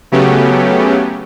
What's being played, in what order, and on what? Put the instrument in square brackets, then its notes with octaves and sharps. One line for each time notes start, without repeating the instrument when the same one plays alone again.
[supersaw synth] C#3 F#3 A3 B3 C#4 G4